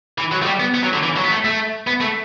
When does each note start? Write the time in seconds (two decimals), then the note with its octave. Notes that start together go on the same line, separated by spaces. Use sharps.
0.18 E3
0.32 F#3
0.42 A3
0.46 G3
0.60 B3
0.74 B3
0.83 F#3
0.93 D3
1.03 E3
1.17 F#3
1.24 B3
1.31 A3
1.45 A3
1.87 B3
2.01 A3